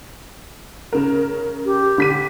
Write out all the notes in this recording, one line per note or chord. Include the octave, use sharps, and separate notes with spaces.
C#3 A#4
G4
D3 B6 D#7